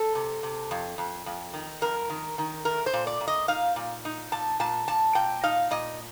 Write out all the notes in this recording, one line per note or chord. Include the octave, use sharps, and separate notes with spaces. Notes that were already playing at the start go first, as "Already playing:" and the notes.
Already playing: A4
C3
C3
F2
F2
F2
D#3
F2 A#4
D#3
D#3
A3 A#4
C5
A#2
D5
A#2
D#5
D#4 F5
A#2
D#4
A#2 A5
A#2 A5
A#2 A5
A#2 G5
D#4 F5
A#2 D#5